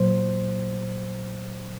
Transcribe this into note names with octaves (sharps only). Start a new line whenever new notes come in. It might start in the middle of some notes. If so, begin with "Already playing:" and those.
Already playing: A#2 F#3 C5